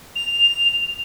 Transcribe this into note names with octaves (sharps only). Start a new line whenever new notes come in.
F7